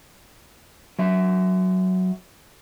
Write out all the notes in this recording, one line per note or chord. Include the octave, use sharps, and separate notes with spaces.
F#3 E5